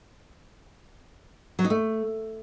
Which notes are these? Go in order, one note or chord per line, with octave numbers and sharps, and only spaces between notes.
F#3
D#4
A3